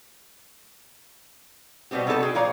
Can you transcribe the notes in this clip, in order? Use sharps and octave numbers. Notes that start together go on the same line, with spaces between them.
B2 G3 B3 C4 G4
C3 B3 D#4 A4 A5
F#4 G#4 G5
A#2 F3 C#5 D5 F5 A#5